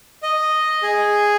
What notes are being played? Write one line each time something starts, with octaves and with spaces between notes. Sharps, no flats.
D#5
G#4